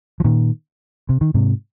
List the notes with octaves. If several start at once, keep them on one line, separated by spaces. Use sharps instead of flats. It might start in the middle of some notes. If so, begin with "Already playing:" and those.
F3
A#2 D#3
C3
D#3
G#2 C3